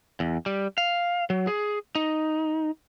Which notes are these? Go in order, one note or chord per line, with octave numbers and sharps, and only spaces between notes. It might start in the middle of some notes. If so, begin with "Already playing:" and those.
E2
G3
F5
F#3
G#4
D#4